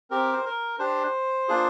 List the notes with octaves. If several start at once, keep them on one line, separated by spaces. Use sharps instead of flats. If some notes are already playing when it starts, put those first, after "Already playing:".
C4 G4 A#4
C5
A#4
D4 G4 C5
A#3 D4 F4 G#4